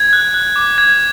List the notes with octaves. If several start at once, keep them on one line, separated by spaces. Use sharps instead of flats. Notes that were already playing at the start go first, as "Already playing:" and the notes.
Already playing: G#6
F#6
F#6
D6
F#6 G#6